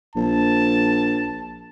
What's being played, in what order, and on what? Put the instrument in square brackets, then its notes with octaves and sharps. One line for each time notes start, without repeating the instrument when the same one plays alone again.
[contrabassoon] A#1 [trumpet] A5